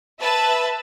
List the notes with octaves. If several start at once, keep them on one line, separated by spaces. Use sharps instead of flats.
B4 E5 A5